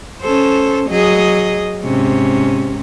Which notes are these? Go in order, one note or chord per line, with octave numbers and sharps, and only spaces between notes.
C#4 A4 C5
F#3 G#4 D#5
G#2 C3 C#4